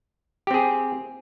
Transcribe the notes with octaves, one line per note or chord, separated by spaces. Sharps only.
C4 G4 G#4